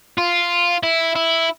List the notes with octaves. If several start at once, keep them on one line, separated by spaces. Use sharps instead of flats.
F4
E4
E4